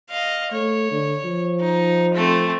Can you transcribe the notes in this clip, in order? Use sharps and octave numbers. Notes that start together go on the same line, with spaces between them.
D#5 F5
A3 C#5
D3
F3
D#4
A3 C4